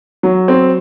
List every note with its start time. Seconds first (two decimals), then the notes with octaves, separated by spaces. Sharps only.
0.23 F#3
0.48 C4